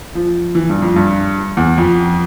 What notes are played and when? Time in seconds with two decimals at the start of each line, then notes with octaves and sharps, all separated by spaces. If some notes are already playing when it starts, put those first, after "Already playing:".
0.15 F3
0.55 E3
0.70 G2
0.82 F2
0.96 G2
1.57 E2
1.78 F2